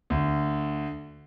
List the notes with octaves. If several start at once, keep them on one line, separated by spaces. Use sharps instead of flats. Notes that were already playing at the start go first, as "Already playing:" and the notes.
D2